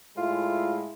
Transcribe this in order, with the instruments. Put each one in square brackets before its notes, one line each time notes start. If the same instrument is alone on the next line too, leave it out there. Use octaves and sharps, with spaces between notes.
[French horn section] A2 G#3 E4 [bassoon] F4